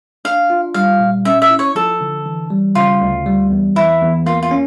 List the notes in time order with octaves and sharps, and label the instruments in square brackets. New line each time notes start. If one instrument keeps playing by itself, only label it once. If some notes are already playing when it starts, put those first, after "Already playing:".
[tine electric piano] D4 [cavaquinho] F5
[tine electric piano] F4
[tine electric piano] G3 [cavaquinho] F5
[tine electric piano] A#2
[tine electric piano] C#4 [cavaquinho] E5
[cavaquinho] E5
[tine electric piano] E4
[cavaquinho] C#5
[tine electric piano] F3 [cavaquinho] A4
[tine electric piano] D3
E3
G3
[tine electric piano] C#3 [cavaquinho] F4
[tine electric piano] D2
G3
E2
[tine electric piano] E3 [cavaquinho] E4
[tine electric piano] E2
[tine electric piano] A#3 [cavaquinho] F4
[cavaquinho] F4
[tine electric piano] C#4